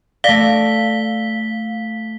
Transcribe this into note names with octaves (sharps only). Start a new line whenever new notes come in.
A3 D5 F5 B6 G7